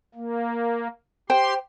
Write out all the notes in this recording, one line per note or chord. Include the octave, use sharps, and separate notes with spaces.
A#3
G4 C5 G5 C6